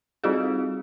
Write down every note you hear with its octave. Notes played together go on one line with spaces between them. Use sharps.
G3 C4 D#4 F4 F#4 G#4